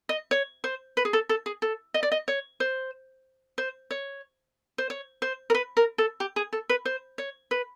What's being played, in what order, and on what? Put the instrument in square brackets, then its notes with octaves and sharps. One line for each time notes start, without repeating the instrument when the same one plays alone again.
[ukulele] D#5
C#5
C5
B4
G#4
A4
A4
G#4
A4
D#5
D5
D#5
C#5
C5
C5
C#5
C5
C#5
C5
A#4
B4
A#4
A4
G4
G#4
A4
B4
C5
C#5
B4